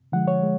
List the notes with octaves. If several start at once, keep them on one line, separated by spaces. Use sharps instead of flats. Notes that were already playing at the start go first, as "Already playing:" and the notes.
D3 F3 G#3 F#5
C#5
G#3